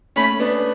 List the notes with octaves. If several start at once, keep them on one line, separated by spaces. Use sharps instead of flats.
A3 C#4 B5
B3 D4